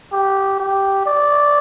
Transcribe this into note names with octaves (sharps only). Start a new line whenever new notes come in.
G4
G4
D5